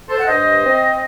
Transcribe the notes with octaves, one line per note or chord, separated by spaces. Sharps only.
A4 C5
F#5
G2 C5 D#5
C4